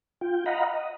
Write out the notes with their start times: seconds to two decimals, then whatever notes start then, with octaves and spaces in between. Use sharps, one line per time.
0.21 F4 G5
0.46 D#5 F5 F#5 A#5 B5
0.74 D#5